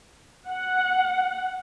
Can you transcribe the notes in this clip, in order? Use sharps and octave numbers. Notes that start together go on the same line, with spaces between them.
F#5